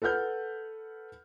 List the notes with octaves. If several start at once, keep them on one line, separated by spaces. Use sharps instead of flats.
A4 B4 F#5 F6 G6